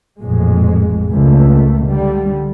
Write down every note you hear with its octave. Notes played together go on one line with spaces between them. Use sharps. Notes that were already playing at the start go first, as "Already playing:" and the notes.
A1 F2 A#2 G#3
C#2 A3 A#3
D3 G3